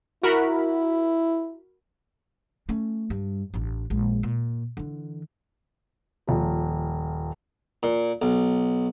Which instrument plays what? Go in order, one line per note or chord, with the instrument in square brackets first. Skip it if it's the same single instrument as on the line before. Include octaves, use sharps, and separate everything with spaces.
[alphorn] E4 [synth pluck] F#4 A#4 B5
[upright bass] A3 C#4
G2
A1 D4
A#1 G#3
A#2
D3 E3
[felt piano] D#1 F3
[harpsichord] A#2
B1